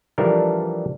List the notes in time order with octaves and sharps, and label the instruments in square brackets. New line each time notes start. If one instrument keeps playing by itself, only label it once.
[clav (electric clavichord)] E3 F3 G3 D4 A4 A#4